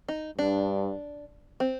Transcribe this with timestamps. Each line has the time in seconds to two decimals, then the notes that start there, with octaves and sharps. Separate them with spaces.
0.08 D#4
0.38 G2 D4
1.60 C4